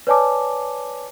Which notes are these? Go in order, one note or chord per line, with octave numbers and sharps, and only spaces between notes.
B4 C#5 D5 G#5 A5 D6